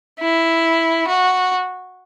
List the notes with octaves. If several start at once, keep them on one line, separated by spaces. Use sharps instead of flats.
E4
F#4